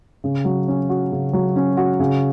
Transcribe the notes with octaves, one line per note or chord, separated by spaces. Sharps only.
C#3
F#3
C#4
F#4
C#3
F#3
C#4
F#4
C#3